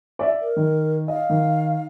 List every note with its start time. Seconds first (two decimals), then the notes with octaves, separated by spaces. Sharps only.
0.19 D5 E5
0.41 A#4
0.56 D#3
1.08 D#5 F5
1.30 D#3